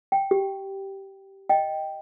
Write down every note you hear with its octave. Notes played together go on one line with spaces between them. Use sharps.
G5
G4
D#5 G5